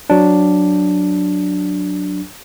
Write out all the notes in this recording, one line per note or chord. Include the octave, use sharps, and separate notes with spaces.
F#3 D4